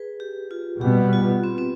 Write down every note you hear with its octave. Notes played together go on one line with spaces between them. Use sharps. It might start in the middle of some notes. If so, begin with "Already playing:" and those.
Already playing: G#4 B4
G4
F4
B2 G3 B3 G4
F4
C4
C4